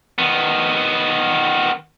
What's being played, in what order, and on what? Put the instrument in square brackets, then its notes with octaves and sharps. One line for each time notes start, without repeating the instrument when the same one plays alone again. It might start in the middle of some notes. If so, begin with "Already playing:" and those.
[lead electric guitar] D#3 B3